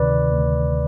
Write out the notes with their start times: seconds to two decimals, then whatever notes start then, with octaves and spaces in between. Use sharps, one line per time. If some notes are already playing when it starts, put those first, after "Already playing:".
Already playing: D2 C3 D#3 B4 D5
0.33 D2